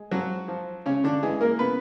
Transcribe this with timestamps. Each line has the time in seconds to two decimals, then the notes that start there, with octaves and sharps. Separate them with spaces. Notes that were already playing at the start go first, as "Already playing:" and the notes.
Already playing: G#3
0.11 F3 F#3 F#4
0.48 F3
0.86 C#3 C#4
1.04 D3 D4
1.23 E3 G#3 G#4
1.41 A#3 A#4
1.59 C#3 B3 B4